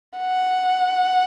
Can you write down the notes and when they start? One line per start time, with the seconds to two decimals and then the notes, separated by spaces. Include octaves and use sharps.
0.18 F#5